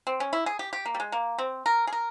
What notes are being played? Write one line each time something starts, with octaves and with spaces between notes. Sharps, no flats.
C4
C#4
E4
G#4
G4
G4
A#3
G3
G#3
A#3
C4
A#4
G#4
A#4